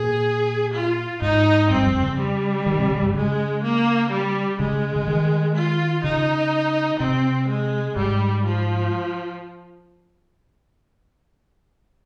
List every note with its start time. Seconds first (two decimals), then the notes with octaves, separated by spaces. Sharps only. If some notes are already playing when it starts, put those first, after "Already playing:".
Already playing: A#2 G#4
0.74 F4
1.22 G#2 D#4
1.70 G2 C4
1.82 G2
1.86 F2
2.02 C#3
2.18 G3
2.66 D#3
2.79 C3
2.91 C#3
3.02 G2
3.14 C#3 G#3
3.63 A#3
4.11 G3
4.60 C#3 G#3
4.96 C#3
5.08 D#3
5.55 F4
6.04 C#3 D#4
7.00 C3 C4
7.49 G#3
7.96 G#2 G3
8.45 F3